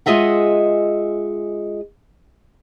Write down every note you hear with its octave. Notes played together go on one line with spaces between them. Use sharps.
G#3 F4 G#4 D#5 E5 F#5